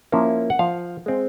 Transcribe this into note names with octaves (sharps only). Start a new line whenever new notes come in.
F3 A#3 C#4 E4
F#5
F3 F5
G#3 C4